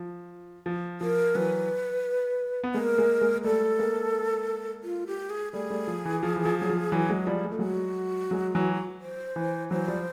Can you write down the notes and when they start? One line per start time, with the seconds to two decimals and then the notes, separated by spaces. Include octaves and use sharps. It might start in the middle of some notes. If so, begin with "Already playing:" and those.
Already playing: F3
0.66 F3
1.01 F3 A#4
1.35 E3 F#3 B4
2.64 B3
2.74 G#3 A#3 A#4
2.98 G#3 A#3
3.21 G#3 A#3
3.36 A#3
3.44 G3 A3 A4
3.79 G#3 A#3
4.83 F4
5.07 G4
5.30 G#4
5.53 G3 A3 G#4
5.70 G3 A3
5.88 F3
6.05 E3
6.23 F3
6.36 E3
6.45 F3
6.62 F#3
6.69 F3
6.92 E3 F#3
7.09 F#3 G#3
7.27 F3 G3
7.45 G#3
7.52 A3
7.59 F#3 G#3 F#4
8.31 F#3 G#3
8.55 E3 F#3
9.01 C5
9.36 E3
9.70 E3 F#3 C5
9.88 F3 G3